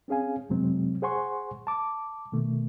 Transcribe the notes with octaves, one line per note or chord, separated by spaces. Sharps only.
C4 C#4 G#4 F5 G#5
F2 C3 F#3 G#3 C4
G#4 C5 F#5 G#5 C6 C#6
A5 D6
B2 D#3 A3